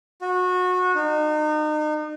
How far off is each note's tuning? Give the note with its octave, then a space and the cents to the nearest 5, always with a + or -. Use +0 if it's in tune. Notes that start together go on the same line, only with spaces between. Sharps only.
F#4 -25
D#4 -35